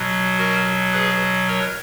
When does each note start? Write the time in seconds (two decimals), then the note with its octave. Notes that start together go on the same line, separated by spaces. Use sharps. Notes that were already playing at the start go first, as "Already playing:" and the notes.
Already playing: B2 F#3
0.38 F#4 A#4
0.93 G#4 B4
1.48 A#4 C#5